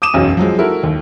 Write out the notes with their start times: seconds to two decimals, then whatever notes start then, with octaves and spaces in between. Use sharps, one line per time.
0.02 D6 D#6 D#7 E7
0.14 E1 B1 F#2
0.37 F3 F#3 G#3
0.59 E4 F#4 A4 A#4
0.83 D#2